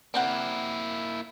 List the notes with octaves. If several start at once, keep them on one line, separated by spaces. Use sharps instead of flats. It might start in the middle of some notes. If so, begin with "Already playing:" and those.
G3 A#3 C4 E4 F#5